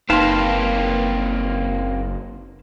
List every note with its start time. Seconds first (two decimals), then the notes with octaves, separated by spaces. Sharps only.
0.10 F#1 A#3 C4 D#4 B4 F5 A5 C6